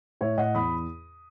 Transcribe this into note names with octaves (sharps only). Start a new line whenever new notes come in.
A2 C#5 E5
A2 D#5 F#5
E2 B5 D#6